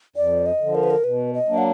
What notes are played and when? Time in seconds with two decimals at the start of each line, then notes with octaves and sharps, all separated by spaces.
0.16 F2 D5
0.46 D#5
0.60 D3 F3
0.75 A#4
0.83 B4
0.90 A#4
1.04 B2 B4
1.34 D#5
1.48 F#3 A#3 D4
1.58 F#5